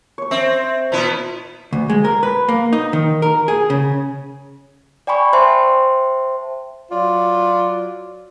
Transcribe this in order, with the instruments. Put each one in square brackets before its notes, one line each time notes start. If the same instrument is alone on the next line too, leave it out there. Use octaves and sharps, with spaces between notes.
[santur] C#5 C#6
[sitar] C4 [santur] E5
[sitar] A#2 B3 E4
[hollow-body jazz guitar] D2
G#3
A#4
B4
A#3
D#4
D#3
A#4
G#4
C#3
[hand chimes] D5 G5 G#5 B5 C#6
C5 E5 G5 A5 C6
[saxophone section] F#3 F4 D5